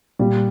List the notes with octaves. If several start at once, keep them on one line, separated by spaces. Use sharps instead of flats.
A#2 G3